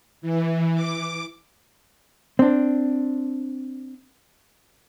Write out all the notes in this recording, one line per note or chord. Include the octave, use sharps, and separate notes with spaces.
E3
D6
C4 D4